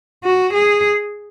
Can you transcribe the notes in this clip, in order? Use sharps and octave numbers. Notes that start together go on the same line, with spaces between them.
F#4
G#4